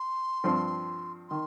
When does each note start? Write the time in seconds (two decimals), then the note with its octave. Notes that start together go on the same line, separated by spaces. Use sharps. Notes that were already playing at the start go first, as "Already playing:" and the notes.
Already playing: C6
0.44 G2 F3 C4
1.29 D#3 C6